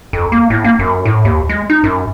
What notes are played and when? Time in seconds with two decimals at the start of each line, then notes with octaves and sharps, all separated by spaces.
0.13 F2
0.32 A#3
0.50 A2
0.64 A#3
0.79 F#2
1.05 A2
1.25 D#2
1.49 G#3
1.70 D#4
1.84 F#2